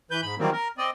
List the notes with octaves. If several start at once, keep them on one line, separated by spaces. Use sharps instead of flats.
E3 B4 G6
G#2 B5
D#3 E3 F#3 G3 A#3 C4
A#4
C4 D5 D#5